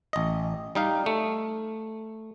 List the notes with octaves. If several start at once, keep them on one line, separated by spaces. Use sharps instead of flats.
A1 D#5
G3 D#4 F5
A3